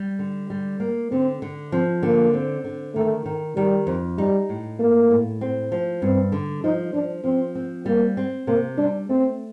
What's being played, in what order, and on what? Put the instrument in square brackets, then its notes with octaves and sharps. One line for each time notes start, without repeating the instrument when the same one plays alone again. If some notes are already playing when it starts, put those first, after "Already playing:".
Already playing: [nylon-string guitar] G3
D3
G3
A#3
[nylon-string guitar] D3 [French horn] C4
[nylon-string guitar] D3
[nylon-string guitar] F3 [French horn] C4
[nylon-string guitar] D3 [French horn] A#3
[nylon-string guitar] C4
D3
[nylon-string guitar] D#3 [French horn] A3
[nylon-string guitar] D#3
[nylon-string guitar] D#3 [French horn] G3
[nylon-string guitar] F2
[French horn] G3 [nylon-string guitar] D#4
[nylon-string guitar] A2
[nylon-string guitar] A3 [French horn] A#3
[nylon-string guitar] A2
C4
F3
[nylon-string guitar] G2 [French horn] C4
[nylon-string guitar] D3
[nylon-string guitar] F3 [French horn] D#4
[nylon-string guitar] F3 [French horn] D4
[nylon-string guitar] F3 [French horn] C4
[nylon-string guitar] C4
[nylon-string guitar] G3 [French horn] A#3
[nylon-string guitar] C4
[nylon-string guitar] C3 [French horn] A#3
[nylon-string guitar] G3 [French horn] D4
[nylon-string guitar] A3 [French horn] C4